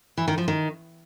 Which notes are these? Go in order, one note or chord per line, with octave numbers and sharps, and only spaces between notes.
E3
D#3
F3
D#3